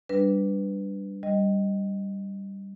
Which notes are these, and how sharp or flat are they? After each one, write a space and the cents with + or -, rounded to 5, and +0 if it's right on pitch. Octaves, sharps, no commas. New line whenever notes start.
G3 +0 D4 +0 B4 +5
G3 +0 D#5 +0